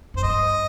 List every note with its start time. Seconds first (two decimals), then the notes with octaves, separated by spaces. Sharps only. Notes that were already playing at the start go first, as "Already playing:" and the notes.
0.14 F#2 C5
0.23 G2 D#5